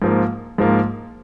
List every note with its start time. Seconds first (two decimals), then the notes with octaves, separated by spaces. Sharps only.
0.02 G#2 F3 A#3
0.58 G#2 F3 A#3